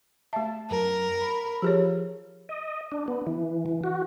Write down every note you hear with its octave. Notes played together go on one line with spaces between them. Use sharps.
A3 E5 A5
F#2 A#4
B5
F3 G4 G#4 C#5
D#5
D4
B3
E3
E3
F#4